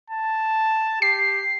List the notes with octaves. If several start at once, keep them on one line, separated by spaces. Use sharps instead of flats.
A5
G4 C7